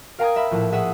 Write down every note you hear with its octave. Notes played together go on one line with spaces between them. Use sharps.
A#4 F5 G5 A#5 D#6 G#6
E5 B5
A#1 A2
G#4 E5 F#5 D#6